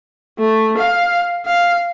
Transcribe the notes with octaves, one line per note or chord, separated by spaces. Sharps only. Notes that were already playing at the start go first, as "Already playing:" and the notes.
A3
F5
F5